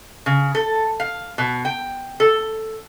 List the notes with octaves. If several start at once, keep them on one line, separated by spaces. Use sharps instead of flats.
C#3
A4
F5
B2
G5
A4